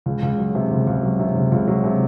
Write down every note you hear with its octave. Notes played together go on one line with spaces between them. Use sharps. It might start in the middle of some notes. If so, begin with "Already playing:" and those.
C#2
C#2
F#3
C3
C#2
C#2
F#3
C3
C#2
C#2
F#3
C3